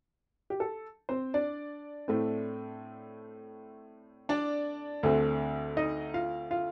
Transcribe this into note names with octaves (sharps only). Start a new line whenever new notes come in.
G4
A4
C4 C5
D4 D5
A2 A3 C4
D4 D5
D2 D3 A3 C4
D#4 D#5
F4 F5
F4 F5